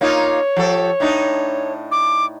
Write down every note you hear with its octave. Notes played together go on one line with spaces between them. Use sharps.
A#3 D#4 F4 C#5
F3 G4 A4
A2 D4 D#4
D6